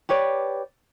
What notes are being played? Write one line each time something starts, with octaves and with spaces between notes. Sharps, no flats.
G4 B4 C#5 D5